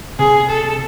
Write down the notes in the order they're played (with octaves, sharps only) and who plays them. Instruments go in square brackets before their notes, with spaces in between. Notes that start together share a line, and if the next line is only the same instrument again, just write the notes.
[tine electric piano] C3 [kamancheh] G#4
[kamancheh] A4